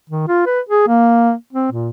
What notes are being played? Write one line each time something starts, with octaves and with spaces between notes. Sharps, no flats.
D#3
F4
B4
G#4
A#3
C4
A#2